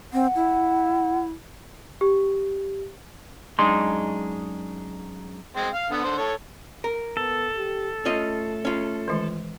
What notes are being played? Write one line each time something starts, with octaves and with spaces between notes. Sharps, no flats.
C4 F#5
E4
G4
F#2 G#3 D4 D#4 G#4 C6
G#3 C4 C5
F5
D3 B3
D3 C5
A4 C#5
A#4
B3 A4
G4
A3 C#4 F4 D#5
C#4 F4
D#3 E3 G#3